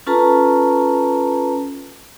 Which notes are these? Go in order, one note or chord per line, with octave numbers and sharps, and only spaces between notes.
C#4 F4 A4 B4 A5 A#5